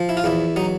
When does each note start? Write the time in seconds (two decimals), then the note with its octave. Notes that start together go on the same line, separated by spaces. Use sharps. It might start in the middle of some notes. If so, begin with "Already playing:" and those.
Already playing: F3
0.09 E4
0.17 F4
0.24 E2 E4
0.56 F#3 D#4